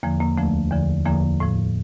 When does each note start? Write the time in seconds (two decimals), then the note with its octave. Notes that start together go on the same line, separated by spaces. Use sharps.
0.03 E2 D3 F3 A#3
0.20 A#3
0.37 D2 D3 F3 A3
0.71 E2 D3 F3
1.06 E2 D3 F3 A#3
1.40 A2 F3